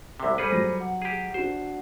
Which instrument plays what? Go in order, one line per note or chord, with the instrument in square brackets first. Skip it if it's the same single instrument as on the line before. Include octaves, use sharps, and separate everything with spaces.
[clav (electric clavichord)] C2 C3
[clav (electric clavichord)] G3 G#4 B4 [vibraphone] A4 C5 [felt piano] C#7
[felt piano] F#3 A#6
[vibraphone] F#5
[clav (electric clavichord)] G4 G#4
[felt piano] D4 F#4 [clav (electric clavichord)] C5